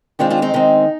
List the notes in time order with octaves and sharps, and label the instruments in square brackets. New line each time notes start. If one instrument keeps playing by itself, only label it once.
[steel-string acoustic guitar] D#3 G#3 C4 D4 F4
D4 F4
C4 D#4
D#3 G#3 C4